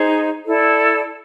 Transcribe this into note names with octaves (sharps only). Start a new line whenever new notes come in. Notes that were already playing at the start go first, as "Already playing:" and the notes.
Already playing: D#4 G#4 C5
E4 A4 D5